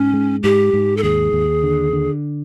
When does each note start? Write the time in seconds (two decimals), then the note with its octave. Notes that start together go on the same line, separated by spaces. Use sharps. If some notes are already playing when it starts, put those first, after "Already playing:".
Already playing: G#2 C#4
0.14 G#3
0.43 G#2 G4
0.73 G#2
0.97 A4
1.03 D#2 G#4
1.33 D#2
1.63 D3
1.93 D3